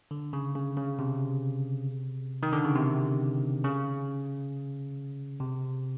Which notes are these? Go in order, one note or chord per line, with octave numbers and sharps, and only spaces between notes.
D3
C#3
C#3
C#3
C3
D#3
D3
C#3
C3
C#3
C3